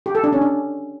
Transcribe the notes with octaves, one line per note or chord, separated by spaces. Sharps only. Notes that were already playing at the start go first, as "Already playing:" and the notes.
G4
A4
D4
C#4
D4